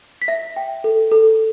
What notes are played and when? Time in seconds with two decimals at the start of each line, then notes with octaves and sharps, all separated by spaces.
0.22 B6
0.28 E5 A#6
0.56 G5
0.84 A4
1.12 A4